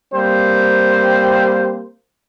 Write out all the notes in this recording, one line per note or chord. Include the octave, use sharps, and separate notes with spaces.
G3 A#3 C4 C5